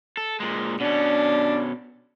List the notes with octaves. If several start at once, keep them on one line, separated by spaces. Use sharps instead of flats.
A4
A#2 G#3
B2 C#4 D4